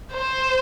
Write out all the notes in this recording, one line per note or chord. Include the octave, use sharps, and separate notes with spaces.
C5